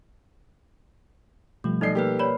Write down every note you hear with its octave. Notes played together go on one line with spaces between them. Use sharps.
B2 F3 G3 A3
B1 D#4 A4 D5 D#5 C7
A#3 G4 A#4 B4
C#5 D5 B5